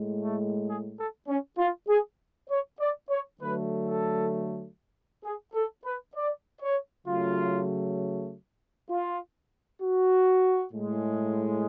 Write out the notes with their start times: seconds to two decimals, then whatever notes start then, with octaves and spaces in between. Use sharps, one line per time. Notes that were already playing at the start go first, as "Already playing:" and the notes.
Already playing: A2 G#3
0.20 A3
0.67 G#4
0.97 A4
1.28 C#4
1.58 F4
1.88 G#4
2.50 C#5
2.80 D5
3.10 C#5
3.40 D3 F#3 A3 B4
3.87 A4
5.24 G#4
5.54 A4
5.85 B4
6.15 D5
6.62 C#5
7.07 C#3 F#3 A3 F4
8.90 F4
9.82 F#4
10.73 A2 G#3